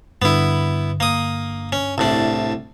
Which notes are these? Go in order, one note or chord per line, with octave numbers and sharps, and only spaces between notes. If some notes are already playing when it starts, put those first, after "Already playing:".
G2 D3 B3 E4
A#3 D#6
C#4
C2 A2 D4